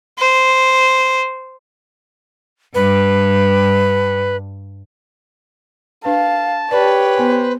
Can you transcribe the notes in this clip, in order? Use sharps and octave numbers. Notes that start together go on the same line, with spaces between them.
C5
G2 B4
D4 B4 F5 A5
G4 B4 C#5 D5
B3 C5 G#5